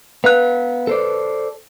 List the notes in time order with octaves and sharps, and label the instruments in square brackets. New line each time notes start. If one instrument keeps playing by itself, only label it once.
[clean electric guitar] B3 F5 [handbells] B4 F#6
[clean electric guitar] A4 C5 D5